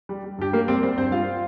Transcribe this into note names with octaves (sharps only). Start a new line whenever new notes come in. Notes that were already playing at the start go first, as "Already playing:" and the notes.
G3
G3
G2 G4
G3 A#3 A#4
G3 C4 C5
G3 C4 C5
G2 C4 C5
G3 F4 F5